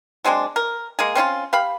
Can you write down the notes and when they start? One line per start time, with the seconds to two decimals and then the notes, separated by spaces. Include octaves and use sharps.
0.24 F#3 G#3 C4 D4
0.56 A#4
0.99 G#3 A#3 G#4
1.15 C4 C#4 E4 F4
1.53 G4 F5 B5